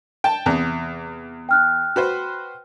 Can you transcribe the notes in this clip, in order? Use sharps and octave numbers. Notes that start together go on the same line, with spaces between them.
G5 A5
E2 C3
G5 F6 F#6
F#4 B4 C5